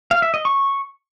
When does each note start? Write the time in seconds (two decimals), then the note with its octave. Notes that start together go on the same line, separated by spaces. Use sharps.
0.11 F5
0.22 E5
0.34 D#5
0.45 C#6